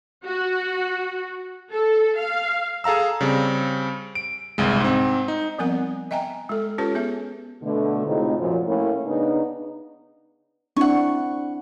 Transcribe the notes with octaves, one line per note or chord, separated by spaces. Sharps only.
F#4
A4
F5
G#4 A4 F5 A#5 E6
C#3 G3 C4
D7
G1 C2 G#3
G#2 C4
D#4
F3 G3 B3 C4 A#4 F#5
D#5 E5 G5 G#5 A#5
G#3 A4
C#4 F4 G4 A4 B4 C#5
B3 G#4 E5
B2 D3 A3
A2 C3 G#3 C4 D#4 F4
F#2 A#2 F3
A2 A#3 C#4 E4
C#3 B3 D4 D#4
C4 D4 E4 F#5 C#6